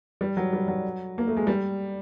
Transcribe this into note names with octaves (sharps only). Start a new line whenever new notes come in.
G3
F#3
G3
F#3
A#3
A3
G#3
G3